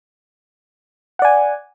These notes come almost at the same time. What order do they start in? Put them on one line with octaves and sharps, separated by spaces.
F#5 D5 G#5